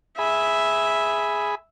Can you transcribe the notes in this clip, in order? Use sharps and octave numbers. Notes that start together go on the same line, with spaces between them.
G#4 E5 B5